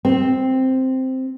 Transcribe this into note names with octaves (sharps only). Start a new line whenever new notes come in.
C4